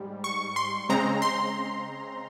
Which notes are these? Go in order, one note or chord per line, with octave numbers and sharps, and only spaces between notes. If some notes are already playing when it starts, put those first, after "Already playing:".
Already playing: G#2 G3
C#6
C6
C#3 G#3 C4 A#5
C6